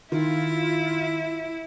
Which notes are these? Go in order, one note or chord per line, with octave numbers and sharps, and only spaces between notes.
D#3 E4 F4